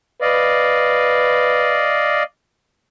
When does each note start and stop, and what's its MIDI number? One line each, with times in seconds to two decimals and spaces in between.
0.22 1.93 71
0.22 2.23 74
0.22 2.23 75
0.22 2.23 77